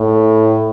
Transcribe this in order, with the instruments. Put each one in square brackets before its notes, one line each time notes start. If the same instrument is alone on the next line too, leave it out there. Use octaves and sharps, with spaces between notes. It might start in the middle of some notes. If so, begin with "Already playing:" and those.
Already playing: [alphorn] A2